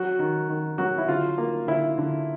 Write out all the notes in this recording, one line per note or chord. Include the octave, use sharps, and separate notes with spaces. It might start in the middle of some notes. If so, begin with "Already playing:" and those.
Already playing: F#3 F#4
D#3
D#3
F#3 F#4
E4
D3 F4
A#3
D3 E4
D3